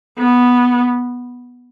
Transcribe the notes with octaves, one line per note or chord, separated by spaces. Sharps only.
B3